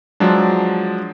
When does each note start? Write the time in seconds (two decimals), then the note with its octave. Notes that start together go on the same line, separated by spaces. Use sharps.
0.20 F3 F#3 G#3 D4